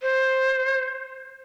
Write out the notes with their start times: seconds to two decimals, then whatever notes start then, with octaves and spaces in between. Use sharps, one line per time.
0.02 C5